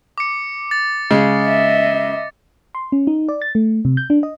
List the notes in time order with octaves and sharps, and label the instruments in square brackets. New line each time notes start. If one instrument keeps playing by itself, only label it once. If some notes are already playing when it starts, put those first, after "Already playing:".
[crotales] D6 C#7
A6
[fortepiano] C#3 G#3
[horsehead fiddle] D#5 E5
[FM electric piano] C6
C#4
D#4
D5
A6
A3
C3
G6
D4
D#5